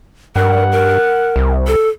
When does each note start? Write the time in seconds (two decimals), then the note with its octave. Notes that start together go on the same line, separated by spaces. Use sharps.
0.36 G2 A#4 F#5
0.72 A#4
1.36 C2
1.67 A4